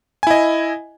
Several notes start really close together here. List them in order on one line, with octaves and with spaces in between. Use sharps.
G#5 E4 D#5